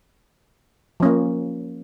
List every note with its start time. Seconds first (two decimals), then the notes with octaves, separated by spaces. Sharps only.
1.00 F3
1.03 C#4
1.05 A#3